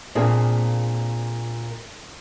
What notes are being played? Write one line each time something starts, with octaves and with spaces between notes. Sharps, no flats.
A#2 A#3 C4 D4 G#4